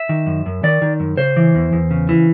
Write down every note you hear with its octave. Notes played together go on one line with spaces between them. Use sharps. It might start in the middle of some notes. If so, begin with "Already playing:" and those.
Already playing: E5
D#3
F#2
F#2
D#3 D5
D#3
F#2
C#3 C5
E3
E2
E2
C#3
E3